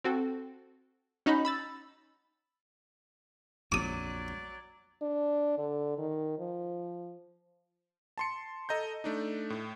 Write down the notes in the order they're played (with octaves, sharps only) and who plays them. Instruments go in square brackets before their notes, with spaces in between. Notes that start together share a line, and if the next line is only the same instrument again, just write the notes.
[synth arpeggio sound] C4 F#4 A4
C#4 D#4 F#4 D#5 B5
B5 E6 A6
[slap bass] A#1 F2 [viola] F#3 D5 [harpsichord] D6 D#6
[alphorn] D4
D3
D#3
F3
[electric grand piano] A5 C6 C#7
A4 D#5 A#5 G6
A3 D4 D#4
A2